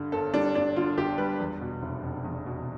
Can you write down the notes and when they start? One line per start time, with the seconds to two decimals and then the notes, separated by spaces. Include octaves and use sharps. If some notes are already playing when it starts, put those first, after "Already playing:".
Already playing: G2 D3
0.12 G1 A4
0.34 G3 D4
0.54 G2 D4
0.76 D3 F4
0.97 G1 G4
1.18 G3 B4
1.40 E2
1.61 B2
1.82 F1
2.03 F1
2.25 E2
2.46 B2